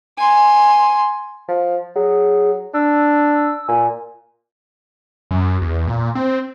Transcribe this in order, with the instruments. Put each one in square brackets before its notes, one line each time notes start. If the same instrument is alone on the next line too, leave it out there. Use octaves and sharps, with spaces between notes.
[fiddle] G#5 C6
[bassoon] F3
[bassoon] F#3 [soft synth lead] G#4
[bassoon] D4 [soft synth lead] E6
[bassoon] A#2 [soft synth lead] G#5
[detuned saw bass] F#2
E2
A#2
C4